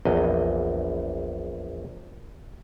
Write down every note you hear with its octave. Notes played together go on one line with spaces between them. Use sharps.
A#1 E2 D#5